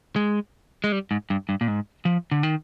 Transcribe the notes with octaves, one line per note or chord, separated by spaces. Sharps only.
G#3
G#3
G3
G#2
G2
G2
A#2
G#2
F3
D3
D#3